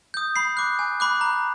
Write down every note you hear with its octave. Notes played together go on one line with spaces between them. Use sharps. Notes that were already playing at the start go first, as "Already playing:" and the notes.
D#6 G6
B5 C7
D6 F#6
G#5
B5 D6 F#6
A#5